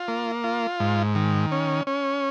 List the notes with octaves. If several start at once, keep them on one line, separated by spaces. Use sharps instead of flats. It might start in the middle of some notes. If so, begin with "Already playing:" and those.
Already playing: F4
A#3
F4
G#2
D#3
C#4
C#4